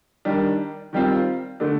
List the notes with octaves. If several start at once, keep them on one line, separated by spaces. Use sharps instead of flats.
D#3 G3 D4
D#3 G3 C4 F4
D3 A3 D4